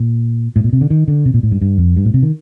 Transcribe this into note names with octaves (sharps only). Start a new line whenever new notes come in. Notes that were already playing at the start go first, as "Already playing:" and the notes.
Already playing: A#2
A2
A#2
C3
D3
D#3
D3
C3
A#2
A2
G2
G2
F2
G2
A2
C3
D#3